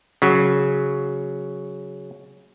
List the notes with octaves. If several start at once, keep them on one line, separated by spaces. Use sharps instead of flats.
C#3 F#3